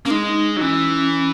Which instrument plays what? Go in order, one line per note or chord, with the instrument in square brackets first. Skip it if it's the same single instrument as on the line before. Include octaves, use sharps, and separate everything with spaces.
[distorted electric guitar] A#3 [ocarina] C#4
[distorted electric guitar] G#3 [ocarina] D#4
[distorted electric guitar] F#3
[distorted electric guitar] E3 [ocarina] C#4